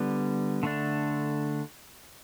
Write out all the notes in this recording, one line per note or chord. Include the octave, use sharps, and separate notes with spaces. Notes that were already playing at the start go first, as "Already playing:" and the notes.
Already playing: D3 G3 B3
D3 A3 D4